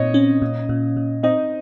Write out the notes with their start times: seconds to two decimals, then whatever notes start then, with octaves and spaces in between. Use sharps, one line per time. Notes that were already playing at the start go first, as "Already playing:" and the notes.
Already playing: A#2 C4 D#4 C#5 D#5
0.14 C#4
0.42 A#2
0.69 A#2
0.97 A#2
1.23 C4 D#4 D#5